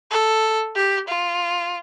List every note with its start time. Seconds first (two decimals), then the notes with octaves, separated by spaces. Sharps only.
0.11 A4
0.75 G4
1.08 F4